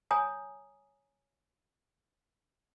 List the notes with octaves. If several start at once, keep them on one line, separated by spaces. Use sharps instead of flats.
C#5 G#5 A#5 D#6